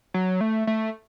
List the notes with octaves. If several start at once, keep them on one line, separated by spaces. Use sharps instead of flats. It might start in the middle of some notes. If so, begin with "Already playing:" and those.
F#3
A3
A3